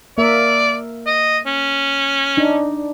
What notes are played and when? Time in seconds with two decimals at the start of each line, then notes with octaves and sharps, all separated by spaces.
0.18 A#3 A#4 D5 E5
1.06 D#5
1.46 C#4
2.37 D4 D#4